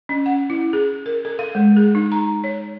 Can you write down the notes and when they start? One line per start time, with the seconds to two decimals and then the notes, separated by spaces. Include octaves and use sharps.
0.09 C#4
0.26 F#5
0.50 E4
0.73 G#4
1.06 A#4
1.25 A4
1.39 F5
1.55 G#3
1.77 G#4
1.95 D#4
2.12 A#5
2.44 C#5